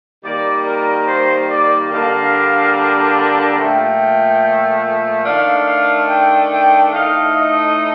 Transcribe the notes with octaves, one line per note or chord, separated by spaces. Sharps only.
D#3 G3 A#3 D5
A#4
C5
D5
D3 G3 A#3 D4 F5
A#2 F3 A3 G5
D#3 A3 D4 F5
F5
G5
G5
A2 A3 D#4 F5
D#5